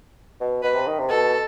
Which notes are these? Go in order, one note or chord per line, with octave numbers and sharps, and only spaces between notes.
B2
B2 B4
C3
D#3
C3
B2 A4